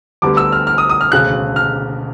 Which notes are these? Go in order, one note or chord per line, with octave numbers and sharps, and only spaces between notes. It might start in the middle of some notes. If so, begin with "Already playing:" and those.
D2 D3 G3 B3 D6
E6
F6
F6
D#6
D#6
F6
E1 D2 C#3 F#6
F6